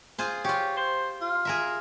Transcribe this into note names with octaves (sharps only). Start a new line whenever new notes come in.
F4 G#4 C5
F4 G4 C#5
C5
F4
G#4 A#4 E5